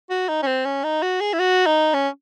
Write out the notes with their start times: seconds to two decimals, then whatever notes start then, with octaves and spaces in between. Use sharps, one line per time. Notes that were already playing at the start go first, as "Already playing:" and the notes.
0.10 F#4
0.29 D#4
0.43 C#4
0.47 C4
0.65 C#4
0.84 D#4
1.02 F#4
1.21 G#4
1.33 E4
1.39 F#4
1.66 D#4
1.94 C#4